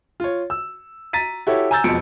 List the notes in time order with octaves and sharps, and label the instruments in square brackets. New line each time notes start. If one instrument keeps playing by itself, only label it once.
[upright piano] F4 C#5
E6
A#5 A6 B6 D#7
E4 F#4 G4 A4 C#5
G#5 A#5 E6 G6 A6
E1 F2 B2 F3 C#7 D7